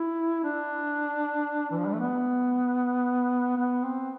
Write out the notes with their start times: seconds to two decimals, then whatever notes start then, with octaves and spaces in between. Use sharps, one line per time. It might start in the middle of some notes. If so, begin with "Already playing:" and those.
Already playing: E4
0.44 D4
1.71 E3
1.78 F3
1.86 G3
1.92 A3
2.00 B3
3.57 B3
3.83 C4